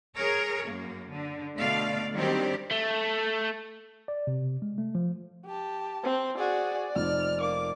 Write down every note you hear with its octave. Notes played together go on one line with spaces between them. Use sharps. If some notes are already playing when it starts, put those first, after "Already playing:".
G#4 A#4 C#5
F#2 A#3
D3
B2 D3 A3 D5 F5
D#3 F#3 G3 C4 D4 G4
A3
D5
C3
G#3
A3
F3
G4 A5
C4
F#4 G#4 D5
F1 F3 D#4 F6
A#3 D6